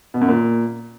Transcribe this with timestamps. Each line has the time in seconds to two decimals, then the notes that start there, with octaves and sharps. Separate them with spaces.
0.14 B2
0.21 F#2
0.29 A#2